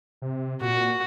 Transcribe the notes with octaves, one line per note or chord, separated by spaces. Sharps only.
C3
A#2 F#4